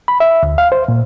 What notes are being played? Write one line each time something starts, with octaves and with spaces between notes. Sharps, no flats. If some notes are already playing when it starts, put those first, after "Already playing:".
B5
E5
D2
F5
C5
A#2